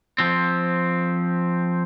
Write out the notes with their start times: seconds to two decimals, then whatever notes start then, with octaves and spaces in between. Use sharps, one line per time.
0.18 F3 C4